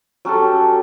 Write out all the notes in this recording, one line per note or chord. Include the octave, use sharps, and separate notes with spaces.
F#3 C#4 G4 A4